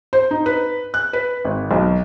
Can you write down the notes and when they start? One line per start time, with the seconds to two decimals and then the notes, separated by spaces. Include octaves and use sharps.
0.13 C5
0.31 D#4
0.46 B4
0.94 F#6
1.13 B4
1.45 G#1
1.71 B1